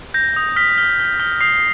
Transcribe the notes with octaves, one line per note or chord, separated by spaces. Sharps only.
G6 A#6
D#6
F6 B6
F6
F6
F6
D#6 C7